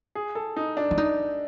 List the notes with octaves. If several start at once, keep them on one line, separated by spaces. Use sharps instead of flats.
G#4
A4
D#4
D4
E4
D#4